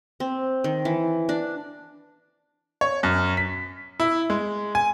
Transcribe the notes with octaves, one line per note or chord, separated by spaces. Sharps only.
C4
D#3
E3
D4
C#5
F#2
B6
E4
G#3
G#5